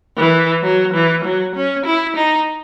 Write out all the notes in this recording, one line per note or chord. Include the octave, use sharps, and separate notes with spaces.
E3
F#3
E3
F#3
C#4
E4
D#4